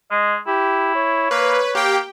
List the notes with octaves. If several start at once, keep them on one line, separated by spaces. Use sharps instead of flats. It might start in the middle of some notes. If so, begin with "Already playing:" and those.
G#3 D#5
E4 G4
C#5
A#3 B4
A#3 G4 G5